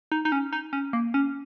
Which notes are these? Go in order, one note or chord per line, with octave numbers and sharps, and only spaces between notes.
D#4
D#4
C#4
D#4
C#4
A#3
C#4